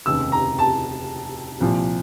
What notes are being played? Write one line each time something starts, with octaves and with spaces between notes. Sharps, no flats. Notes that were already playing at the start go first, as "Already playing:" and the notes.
F1 D#2 C#3 E6
A#5
A5
C2 A#2 F3